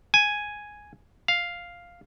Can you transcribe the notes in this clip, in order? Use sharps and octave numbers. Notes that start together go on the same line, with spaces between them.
G#5
F5